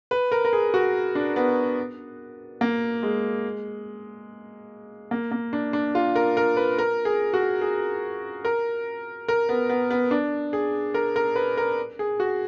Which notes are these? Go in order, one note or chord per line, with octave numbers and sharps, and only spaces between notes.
B4
A#4
A#4
G#4
F#4
D4
B3
A#3
G#3
A#3
A#3
D4
D4
F4
A#4
A#4
B4
A#4
G#4
F#4
G#4
A#4
A#4
B3
B3
B3
D4
G#4
A#4
A#4
B4
A#4
G#4
F#4